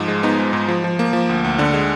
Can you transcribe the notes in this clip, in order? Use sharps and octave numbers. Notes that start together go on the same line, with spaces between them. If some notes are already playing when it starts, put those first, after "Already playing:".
Already playing: G#2 F3
G#3
B3 D#4
G#3
G#2
F3
F3
A#3
F3
D2
D2
D3 D4
G#3